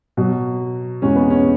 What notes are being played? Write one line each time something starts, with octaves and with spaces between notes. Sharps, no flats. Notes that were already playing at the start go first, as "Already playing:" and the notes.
B2 F#3
E2 B2 G#3 C#4
B3
C#4